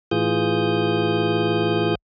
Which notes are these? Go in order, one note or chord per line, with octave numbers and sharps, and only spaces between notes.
A2 E3 F4 G#4 D#6 G6